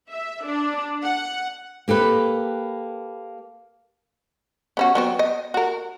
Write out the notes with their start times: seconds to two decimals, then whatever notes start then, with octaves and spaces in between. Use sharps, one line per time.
0.11 E5
0.44 D4
1.04 F#5
1.88 A#3 G4 A4 B4
4.77 B3 C#4 F#4
4.95 F#3 B3 C4
5.19 D#5
5.54 F#4 A#4